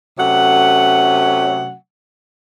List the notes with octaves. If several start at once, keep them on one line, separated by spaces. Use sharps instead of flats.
C3 F#3 A3 C#4 F#5